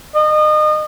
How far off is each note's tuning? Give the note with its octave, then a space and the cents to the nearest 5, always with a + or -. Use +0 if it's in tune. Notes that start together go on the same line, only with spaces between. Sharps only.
D#5 -30